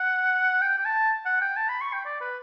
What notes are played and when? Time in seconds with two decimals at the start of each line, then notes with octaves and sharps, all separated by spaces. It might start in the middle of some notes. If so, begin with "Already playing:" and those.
Already playing: F#5
0.62 G5
0.78 G5
0.85 A5
1.25 F#5
1.41 G5
1.57 A5
1.69 B5
1.81 C#6
1.93 G5
2.06 D5
2.21 B4